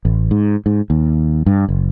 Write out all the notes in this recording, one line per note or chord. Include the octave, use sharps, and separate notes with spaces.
A1
G#2
G#2
D#2
G2
F#1